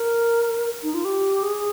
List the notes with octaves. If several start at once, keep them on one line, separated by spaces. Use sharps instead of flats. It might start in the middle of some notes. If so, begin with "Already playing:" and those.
Already playing: A#4
D#4
F4
G4
G#4